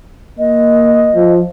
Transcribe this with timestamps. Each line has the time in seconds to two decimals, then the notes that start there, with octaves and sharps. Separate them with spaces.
0.39 A#3 D#5
1.14 F3